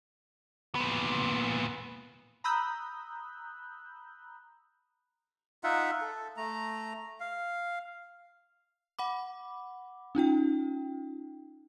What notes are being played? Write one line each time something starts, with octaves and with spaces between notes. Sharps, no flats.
A#2 B3
A#5 B5 D#6 E6 F#6 G6
D#4 F4 E5 F#5
A4
A3 A#5
F5
F#5 B5 D6
C#4 D#4 F4 G5